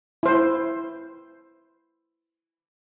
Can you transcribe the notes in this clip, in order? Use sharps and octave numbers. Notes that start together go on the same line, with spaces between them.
E4 C5